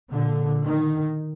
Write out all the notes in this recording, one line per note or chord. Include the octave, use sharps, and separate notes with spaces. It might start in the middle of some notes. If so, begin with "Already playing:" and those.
A#2 D3
D#3